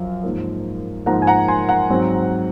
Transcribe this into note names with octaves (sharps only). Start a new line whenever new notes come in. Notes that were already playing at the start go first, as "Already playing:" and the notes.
Already playing: F#2 F3 F5
G#2 F3 A#3
G#2 F3 A#3 F#5 A#5
G#5
F#5 A#5
G#5 C6
F#5 A#5
G#2 F#3 C4